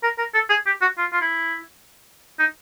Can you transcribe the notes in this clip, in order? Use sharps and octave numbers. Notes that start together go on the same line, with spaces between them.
A#4
A#4
A4
G#4
G4
F#4
F4
F4
E4
D#4